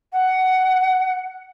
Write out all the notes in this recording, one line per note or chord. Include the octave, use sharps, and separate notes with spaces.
F#5